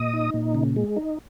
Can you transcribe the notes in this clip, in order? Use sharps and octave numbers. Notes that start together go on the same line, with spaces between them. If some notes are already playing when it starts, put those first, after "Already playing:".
Already playing: A#2 D#5 D#6
D#4
A#2
C#3
G#3
D#4